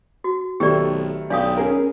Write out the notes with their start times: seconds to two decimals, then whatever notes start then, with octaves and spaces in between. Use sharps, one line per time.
0.24 F#4
0.60 B1 D#3 A3 C4 G4 D5
1.30 B1 D4 D5 F5 G5 D#6
1.57 C#4 G#4 A#4